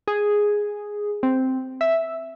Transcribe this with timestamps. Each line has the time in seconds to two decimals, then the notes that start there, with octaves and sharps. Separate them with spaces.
0.08 G#4
1.23 C4
1.81 E5